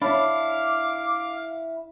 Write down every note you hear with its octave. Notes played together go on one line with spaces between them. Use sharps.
D4 E4 C#5 F5 B5 D6